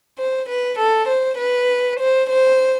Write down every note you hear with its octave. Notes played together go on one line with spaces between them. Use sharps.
C5
B4
A4
C5
B4
C5
C5